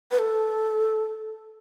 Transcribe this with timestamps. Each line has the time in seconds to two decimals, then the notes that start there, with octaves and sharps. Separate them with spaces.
0.11 B4
0.19 A4